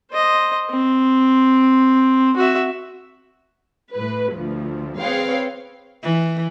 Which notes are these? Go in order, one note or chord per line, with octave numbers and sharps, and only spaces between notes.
C5 D#5
C4
F#4 E5
A2 B4
D2 F3
C4 G#4 B4 C#5 F5 G5
E3